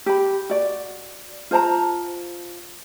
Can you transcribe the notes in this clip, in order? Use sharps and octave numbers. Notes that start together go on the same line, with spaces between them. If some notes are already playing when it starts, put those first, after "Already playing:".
G4 B5
F#4 D5
F4 C5 A5 A#5